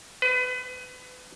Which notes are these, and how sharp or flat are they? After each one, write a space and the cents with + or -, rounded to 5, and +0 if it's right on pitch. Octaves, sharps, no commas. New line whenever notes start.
B4 +30